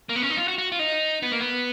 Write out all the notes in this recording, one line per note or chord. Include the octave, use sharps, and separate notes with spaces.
A#3
B3
C#4
D#4
F4
F#4
F#4
F4
D#4
B3
A#3
B3